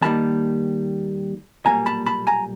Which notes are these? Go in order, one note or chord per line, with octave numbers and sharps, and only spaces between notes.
D#2 D#3 G3 A#3 A5 B5
B1 A#2 G3 A#3 G#5 A#5
A5 B5
A5 B5
G#5 A#5